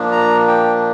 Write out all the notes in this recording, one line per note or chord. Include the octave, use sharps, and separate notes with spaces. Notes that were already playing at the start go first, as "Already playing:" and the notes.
Already playing: A#2 F3 A#3 D4
A#5
G5